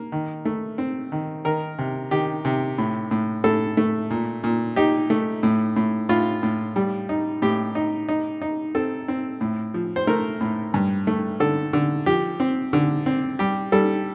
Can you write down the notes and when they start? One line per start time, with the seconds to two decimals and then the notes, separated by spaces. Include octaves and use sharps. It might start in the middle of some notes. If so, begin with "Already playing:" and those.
Already playing: A#3
0.12 D#3
0.45 A3
0.78 C4
1.12 D#3
1.45 D#3 A#4
1.78 C3
2.11 D#3 G4
2.45 C3
2.78 A2
3.11 A2
3.44 A2 A4
3.77 A3
4.10 A#2
4.44 A#2
4.76 D#4 G4
5.10 A3
5.43 A2
5.76 A2
6.09 A2 F4
6.43 A2
6.76 G3
7.09 D#4
7.42 A2 G4
7.75 D#4
8.08 D#4
8.42 D#4
8.75 C4 A4
9.08 C4
9.41 A2
9.74 F3
9.96 C5
10.07 A3 A#4
10.41 A2
10.74 G2
11.07 A3
11.40 D3 A4
11.73 D3
12.06 F3 G4
12.40 C4
12.73 D3
13.06 C4
13.39 G3 G4
13.72 G3 A4